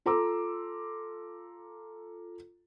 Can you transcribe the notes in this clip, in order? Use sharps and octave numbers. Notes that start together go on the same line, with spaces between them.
F4 A4 A#5 C6 D6 E6